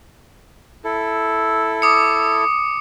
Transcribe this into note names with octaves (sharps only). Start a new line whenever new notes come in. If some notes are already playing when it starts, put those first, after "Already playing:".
E4 A4
D6 D#6 C#7